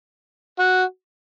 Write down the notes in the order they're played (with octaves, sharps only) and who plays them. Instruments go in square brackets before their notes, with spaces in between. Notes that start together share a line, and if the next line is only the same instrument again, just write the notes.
[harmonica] F#4